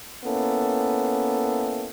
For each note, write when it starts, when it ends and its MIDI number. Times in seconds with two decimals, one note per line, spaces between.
0.24 1.89 58
0.24 1.89 59
0.24 1.89 61
0.24 1.89 64
0.24 1.89 69